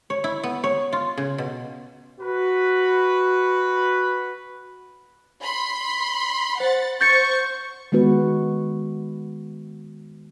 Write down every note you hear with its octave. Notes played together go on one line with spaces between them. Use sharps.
C#5
E4
B3
C#5
F4
C#3
B2
F#4 B4
B5 C6
C5 F#5 A6
C5 C#6 G6 A6 C#7
D#3 G#3 B3 F#4 B4